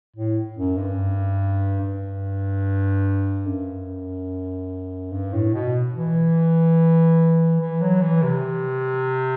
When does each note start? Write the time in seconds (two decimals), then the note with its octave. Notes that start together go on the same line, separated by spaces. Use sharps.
0.16 A2
0.57 F#2
0.78 G2
1.81 G2
3.46 F#2
5.12 G2
5.33 A2
5.54 B2
5.95 E3
7.60 E3
7.81 F#3
8.01 E3
8.23 C3